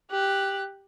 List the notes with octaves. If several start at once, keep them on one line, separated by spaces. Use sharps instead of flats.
G4 F#6